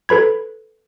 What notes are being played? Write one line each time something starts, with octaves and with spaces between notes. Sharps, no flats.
A4 B4 B5 G#6